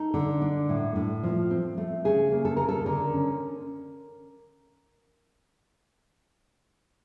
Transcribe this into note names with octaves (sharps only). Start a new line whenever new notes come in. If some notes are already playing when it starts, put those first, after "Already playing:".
Already playing: D#4 A4
D3
D4
A2
A2
F3
C4
A3
C#3 G#4
A#3
A4
C#3 A#4
A4
D3 A#4
C#4